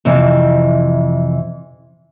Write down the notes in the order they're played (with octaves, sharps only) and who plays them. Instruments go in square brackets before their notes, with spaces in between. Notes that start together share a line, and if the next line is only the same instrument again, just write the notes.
[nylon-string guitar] F2 C3 E3 E5